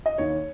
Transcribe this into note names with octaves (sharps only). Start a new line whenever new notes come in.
D#5
D#2 D#3 C#5